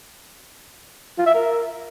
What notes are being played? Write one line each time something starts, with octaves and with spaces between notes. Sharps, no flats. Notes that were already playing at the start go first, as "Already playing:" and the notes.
F4
E5
A#4